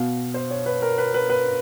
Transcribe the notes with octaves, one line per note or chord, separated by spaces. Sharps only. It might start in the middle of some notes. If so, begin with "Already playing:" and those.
Already playing: B2 F5
C5
C#5
B4
A#4
B4
B4
B4